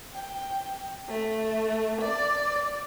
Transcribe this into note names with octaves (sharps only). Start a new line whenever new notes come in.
G5
A3
D5